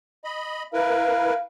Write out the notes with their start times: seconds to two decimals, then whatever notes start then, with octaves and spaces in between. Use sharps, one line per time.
0.24 D#5 B5
0.74 E4 A#4 B4 F5